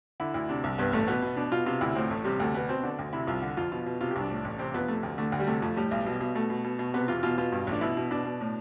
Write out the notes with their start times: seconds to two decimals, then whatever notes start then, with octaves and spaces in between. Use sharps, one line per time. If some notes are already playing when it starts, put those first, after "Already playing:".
0.20 D3 E4
0.34 D2 E4
0.49 C3 D4
0.64 C2
0.78 G2 B3
0.93 A1 A3
1.08 B2 B3
1.22 B2
1.37 B2 D4
1.51 B2 F4
1.66 C3 F4
1.81 D2 E4
1.95 A2 C4
2.10 A1 A3
2.24 C3 G3
2.39 D2 A3
2.54 B2 B3
2.69 B2 C4
2.83 D3 D4
2.99 D2
3.13 C3 E4
3.27 C2 F4
3.42 D3
3.57 F2 F4
3.72 B2 F4
3.86 B2
4.01 C3 F4
4.11 G4
4.16 C2 D4
4.30 A2
4.45 A1
4.59 C3 C4
4.74 F2 B3
4.88 C3 A3
5.03 D2
5.18 D3 A3
5.32 D2
5.39 G3
5.47 C3 A3
5.62 F2 A3
5.77 A2 G3
5.91 B1
6.06 B2
6.21 B2
6.35 B2 A3
6.50 B2
6.64 B2
6.79 B2
6.94 C3 B3
7.08 E2 F4
7.23 B2 F4
7.38 B2 F4
7.52 G2
7.67 A1
7.72 D4
7.81 B2 E4
7.97 B2
8.11 B2 D4
8.25 B2
8.41 A2